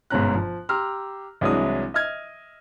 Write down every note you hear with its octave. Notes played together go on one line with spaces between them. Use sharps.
G1 G#2 B2 C#4 A#5 F#6
F3
G4 A#5 C6 E6 F6
C2 E3 F#3 G#3 D4 D#6
D#5 E5 F6 G#6